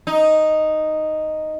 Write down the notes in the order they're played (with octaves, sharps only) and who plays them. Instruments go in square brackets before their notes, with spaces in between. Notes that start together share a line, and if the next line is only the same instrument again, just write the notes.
[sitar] D#4